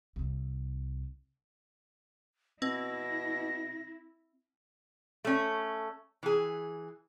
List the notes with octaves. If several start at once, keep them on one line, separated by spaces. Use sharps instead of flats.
C2 C4
B2 C4 E4 A#6
A3 C#4
E3 G#4